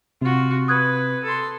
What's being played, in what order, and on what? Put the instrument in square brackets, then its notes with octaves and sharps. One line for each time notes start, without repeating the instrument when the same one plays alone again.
[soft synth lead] C3 [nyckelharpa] F4 F#4
[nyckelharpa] B4 [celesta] D#6 F#6 G#6
[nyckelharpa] A4 C6